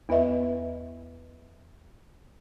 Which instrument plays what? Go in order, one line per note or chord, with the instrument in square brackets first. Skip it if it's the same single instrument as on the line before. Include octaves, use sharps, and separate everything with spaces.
[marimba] E2 B3 B4 D#5 E5